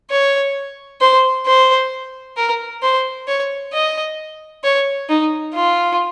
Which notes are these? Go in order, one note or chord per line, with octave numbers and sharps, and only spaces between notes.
C#5
C5
C5
A#4
C5
C#5
D#5
C#5
D#4
F4